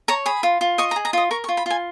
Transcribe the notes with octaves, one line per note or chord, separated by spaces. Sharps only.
C#5 A#5
G#4 B5
F4
F4
D#5 C#6
A#5
G#4
A#5
F4 D#5
A#4 C#6
C#6
F4
B5
F4 G#5